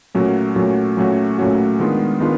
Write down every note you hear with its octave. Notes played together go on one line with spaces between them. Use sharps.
A#2 F#3 A3 C#4 F#4
A#2 F#3 A3 C#4 F#4
A#2 F#3 A3 C#4 F#4
A#2 F#3 A3 C#4 F#4
D#3 G#3 B3 D4 F4
D#3 G#3 B3 D4 F4